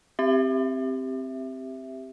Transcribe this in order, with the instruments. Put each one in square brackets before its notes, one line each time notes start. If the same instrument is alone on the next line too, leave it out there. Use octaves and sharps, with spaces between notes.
[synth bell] C4 G4 E5